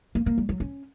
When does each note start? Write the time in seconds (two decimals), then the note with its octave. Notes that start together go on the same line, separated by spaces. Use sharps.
0.15 A#3
0.26 A#3
0.38 G3
0.49 F#3
0.60 C#4